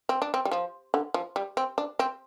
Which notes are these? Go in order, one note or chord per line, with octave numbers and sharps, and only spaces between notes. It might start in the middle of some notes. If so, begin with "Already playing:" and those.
C4
D4
C4
G3
F3
D3
F3
G3
C4
D4
C4